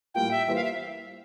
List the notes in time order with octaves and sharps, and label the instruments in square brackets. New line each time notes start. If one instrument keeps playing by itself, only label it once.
[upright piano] A2 G3 A#3 F4 [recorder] G5
[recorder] E5
[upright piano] E3 G3 A#3 F4 C5 [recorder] E5
[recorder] F5
E5